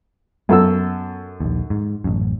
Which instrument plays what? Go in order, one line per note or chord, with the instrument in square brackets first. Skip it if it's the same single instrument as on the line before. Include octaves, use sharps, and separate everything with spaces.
[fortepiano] F#2 A4 E6 [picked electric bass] B3
[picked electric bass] A#1 D#2
G#2
A1 F#2